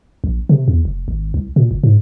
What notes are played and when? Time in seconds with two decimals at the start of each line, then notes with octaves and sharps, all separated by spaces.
0.24 A#1
0.49 C3
0.68 E2
0.85 F1
1.08 G#1
1.34 C2
1.56 A#2
1.71 F#1
1.83 G#2